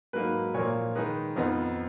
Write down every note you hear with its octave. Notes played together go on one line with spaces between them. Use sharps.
G#2 F#3 A#3 D#4 B4
A#2 F3 A#3 C#5
D#3 G#3 D#4 B4
F2 F3 B3 D#4